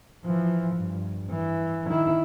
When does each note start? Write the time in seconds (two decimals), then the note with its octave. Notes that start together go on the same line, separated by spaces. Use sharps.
0.24 E3 F3
0.75 G2
1.31 E3
1.88 D#3 E4